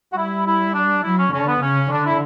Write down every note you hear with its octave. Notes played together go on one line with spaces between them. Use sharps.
F#4
G3 E4
E4
D4
F#3 E4
C#4
D3 C#4
B3
C#3 C#4
D3 D4
E4